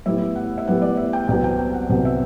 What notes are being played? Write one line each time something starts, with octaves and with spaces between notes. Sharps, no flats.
A2 G3 B3 E4 E5
F#5
E5
A2 G3 B3 E4 F#5
D5
E5
G5
C2 C3 F#3 B3 G5
G5
G5
F#5
C2 C3 F#3 B3 F#5
E5